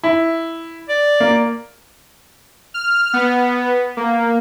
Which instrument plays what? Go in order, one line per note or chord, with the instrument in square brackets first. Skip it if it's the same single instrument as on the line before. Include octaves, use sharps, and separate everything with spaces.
[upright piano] E4
[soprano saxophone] D5
[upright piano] A#3
[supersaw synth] F6
B3
A#3